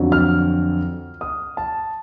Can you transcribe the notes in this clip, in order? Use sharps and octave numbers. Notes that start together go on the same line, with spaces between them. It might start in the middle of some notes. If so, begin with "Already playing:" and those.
Already playing: F2 D3 F#3
F6
D#6
A5